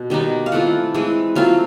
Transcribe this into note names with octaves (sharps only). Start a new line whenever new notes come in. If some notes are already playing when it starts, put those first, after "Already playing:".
Already playing: B2
D#3 G3 B3 D#4
F5
E3 A3 C4 F4 F#5
E3 G#3 C4
F#3 A3 C4 F4 F5